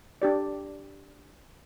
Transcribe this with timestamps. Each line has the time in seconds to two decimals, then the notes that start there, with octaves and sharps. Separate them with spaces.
0.22 D4 G4 D5